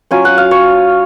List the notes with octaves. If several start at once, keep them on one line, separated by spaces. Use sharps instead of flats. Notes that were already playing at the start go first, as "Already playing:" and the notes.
F#3 C#4 F4 G#5
F#5
F5
C#5